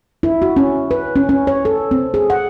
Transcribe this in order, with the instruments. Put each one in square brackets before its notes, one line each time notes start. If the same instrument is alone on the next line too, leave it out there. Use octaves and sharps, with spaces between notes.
[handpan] E4
F#4
C#4
B4
C#4
C#4
C#5
A4
C4
G#4
F#5